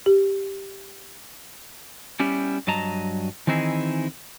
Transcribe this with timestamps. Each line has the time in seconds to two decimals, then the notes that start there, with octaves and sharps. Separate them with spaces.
0.06 G4
2.20 G3 B3 C#4 E4 G4
2.67 G2 F#3 D#5 A5 A#5
3.47 D#3 E3 C4 D#4 E4 G#4